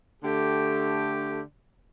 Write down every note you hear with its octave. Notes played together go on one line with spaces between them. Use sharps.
D3 A3 G4